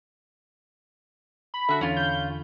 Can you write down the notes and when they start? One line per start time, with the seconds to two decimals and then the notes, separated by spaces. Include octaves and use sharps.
1.54 B5
1.69 D3 F#4 A4 E5
1.81 E2 D3 C#4 F4
1.97 G6